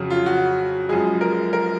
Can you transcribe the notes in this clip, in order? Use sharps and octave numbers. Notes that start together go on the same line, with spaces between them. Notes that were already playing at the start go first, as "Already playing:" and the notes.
Already playing: F2 C#3 F#3
F4
F#4
F#2 F3 G#3 G#4
A#4
A#4